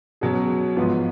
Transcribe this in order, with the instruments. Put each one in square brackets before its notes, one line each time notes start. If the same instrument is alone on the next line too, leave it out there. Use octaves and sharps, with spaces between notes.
[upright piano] B2 F#3 C#4 G#4
G#2 F3 B3 F4